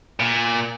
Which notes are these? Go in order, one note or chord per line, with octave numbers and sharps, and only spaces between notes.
A#2